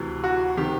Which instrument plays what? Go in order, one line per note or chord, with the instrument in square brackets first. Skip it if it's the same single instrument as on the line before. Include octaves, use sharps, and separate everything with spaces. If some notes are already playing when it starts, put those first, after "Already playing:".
Already playing: [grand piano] D2 C3 E3
F#4
C3 D#3 G4